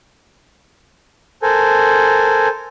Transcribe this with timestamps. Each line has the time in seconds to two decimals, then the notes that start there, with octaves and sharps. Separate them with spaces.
1.42 A4 A#4 C5 G#5